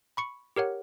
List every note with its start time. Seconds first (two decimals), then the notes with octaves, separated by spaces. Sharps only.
0.17 B5 C#6 C#7
0.56 G4 A#4 C#5 F#5